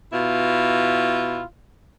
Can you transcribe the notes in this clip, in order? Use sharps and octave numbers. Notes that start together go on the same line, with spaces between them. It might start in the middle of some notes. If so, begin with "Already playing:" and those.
B2 E4 F4